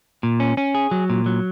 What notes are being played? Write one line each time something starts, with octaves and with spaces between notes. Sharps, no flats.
A#2
C#4
C#4
G#4
F#3
A#2
F#3